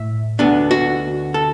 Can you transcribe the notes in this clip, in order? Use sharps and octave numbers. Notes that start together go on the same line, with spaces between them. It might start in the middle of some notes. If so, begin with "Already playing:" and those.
Already playing: A2 E5
D2 D3 B3 D4
F#4
A4